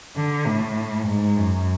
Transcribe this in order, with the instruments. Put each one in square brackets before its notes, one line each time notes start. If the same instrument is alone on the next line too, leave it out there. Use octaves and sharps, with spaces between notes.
[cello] D3
A2
G#2
F#2